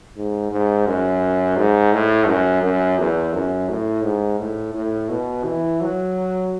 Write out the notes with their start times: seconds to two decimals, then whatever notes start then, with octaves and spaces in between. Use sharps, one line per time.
0.17 G#2
0.51 G#2
0.87 F#2
1.57 G#2
1.93 A2
2.28 F#2
2.62 F#2
2.99 E2
3.34 F#2
3.69 A2
4.04 G#2
4.39 A2
4.74 A2
5.10 B2
5.44 E3
5.81 F#3